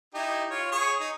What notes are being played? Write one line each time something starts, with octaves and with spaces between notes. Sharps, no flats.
D#4 E4 G4
F4 C#5
G#4 C#5 C#6
D#4